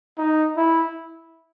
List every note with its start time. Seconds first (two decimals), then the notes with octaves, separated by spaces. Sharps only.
0.18 D#4
0.57 E4